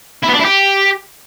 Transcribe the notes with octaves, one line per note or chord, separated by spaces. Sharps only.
E4
B3
D4
E4
G4